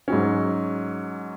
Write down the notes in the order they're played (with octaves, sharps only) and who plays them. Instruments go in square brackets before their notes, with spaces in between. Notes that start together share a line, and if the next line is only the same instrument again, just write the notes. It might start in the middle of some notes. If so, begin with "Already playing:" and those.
[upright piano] G#2 F#3 C#4